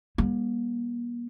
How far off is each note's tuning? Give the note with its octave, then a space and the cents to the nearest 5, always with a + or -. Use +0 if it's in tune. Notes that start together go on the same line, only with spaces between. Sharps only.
G3 +30 A#3 +45